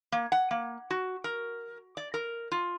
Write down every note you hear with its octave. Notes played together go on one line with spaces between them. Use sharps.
A#3
F#5
A#3
F#4
A#4
D5
A#4
F4